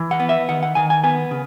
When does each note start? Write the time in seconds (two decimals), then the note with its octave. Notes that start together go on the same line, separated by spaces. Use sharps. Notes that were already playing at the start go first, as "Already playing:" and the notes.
Already playing: E3
0.11 F#5
0.20 B3
0.29 E5
0.49 D#3 F#5
0.63 F#5
0.75 D#3 G#5
0.90 G#5
1.04 B3 G#5
1.31 C#3